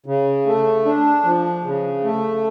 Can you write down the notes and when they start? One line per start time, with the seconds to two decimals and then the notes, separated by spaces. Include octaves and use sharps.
0.06 C#3
0.46 A3
0.85 D4
1.24 F3
1.64 C#3
2.03 A3